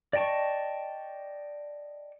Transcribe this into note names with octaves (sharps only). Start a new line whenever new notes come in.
D5 D#5 G5 A5 C#6